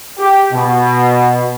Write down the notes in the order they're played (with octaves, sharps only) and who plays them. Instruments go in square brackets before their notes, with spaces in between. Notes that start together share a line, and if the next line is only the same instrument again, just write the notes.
[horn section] G4
B2